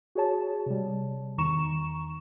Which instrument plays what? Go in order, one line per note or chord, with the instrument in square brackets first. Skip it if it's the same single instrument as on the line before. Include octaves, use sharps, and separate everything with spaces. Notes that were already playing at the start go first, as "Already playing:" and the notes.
[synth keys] F#4 G#4 C#5 A5
C3 G3
E2 D#3 A#5 C#6 E7